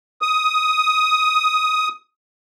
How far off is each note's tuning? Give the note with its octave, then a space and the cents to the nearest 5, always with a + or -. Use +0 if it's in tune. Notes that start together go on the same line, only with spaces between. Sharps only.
D#6 +15